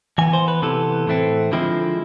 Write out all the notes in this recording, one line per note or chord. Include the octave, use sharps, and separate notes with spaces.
E3 B3 G#5
C5
B4
C3 E3 B3 A4
A2 E3 A3 C4
D3 F3 G#3 C4 E4